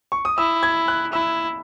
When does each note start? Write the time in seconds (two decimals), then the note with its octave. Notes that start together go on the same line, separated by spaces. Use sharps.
0.12 C#6
0.25 D#6
0.38 E4 E6
0.63 G#6
0.88 F#6
1.12 E4 E6